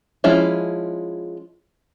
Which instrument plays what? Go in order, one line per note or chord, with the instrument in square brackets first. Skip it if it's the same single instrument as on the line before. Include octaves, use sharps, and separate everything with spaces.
[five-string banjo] F3 G#3 C#4 E4